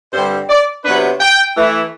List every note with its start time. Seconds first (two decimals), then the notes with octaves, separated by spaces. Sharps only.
0.13 G2 D3 G3 C4 C5
0.50 D5
0.85 C3 F#3 B3 D4 B4
1.20 G5
1.57 E3 A3 E4